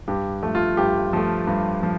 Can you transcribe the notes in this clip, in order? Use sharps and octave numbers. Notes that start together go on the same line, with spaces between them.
G2 G4
F3 A3
F4
G2 G4
F3 A3
G2
F3